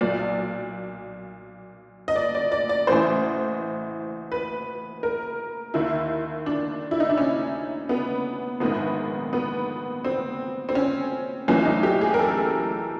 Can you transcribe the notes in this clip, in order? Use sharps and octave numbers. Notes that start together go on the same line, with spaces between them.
B1 A#2 D5
D#5
D5
D5
D5
D5
A1 A2 E3 C5
B4
A#4
D#2 D#3 E4
D4
E4
D#4
D4
C#4
B3
A#1 G#2 D#3 B3
B3
C4
C4
C#4
B1 A2 E3 C#4
D#4
G4
G#4
A#4
A4